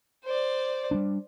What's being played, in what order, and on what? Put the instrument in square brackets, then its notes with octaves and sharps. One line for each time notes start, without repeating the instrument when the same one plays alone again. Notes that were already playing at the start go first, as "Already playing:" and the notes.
[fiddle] C5 D5
[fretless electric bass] G3 A#3 D4